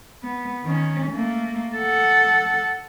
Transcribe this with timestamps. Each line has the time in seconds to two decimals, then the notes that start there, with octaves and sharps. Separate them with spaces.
0.23 B3
0.64 D#3 C#4
1.11 A3 A#3
1.76 A4 F#5